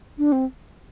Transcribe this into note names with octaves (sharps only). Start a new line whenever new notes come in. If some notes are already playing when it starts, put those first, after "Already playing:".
D4
C4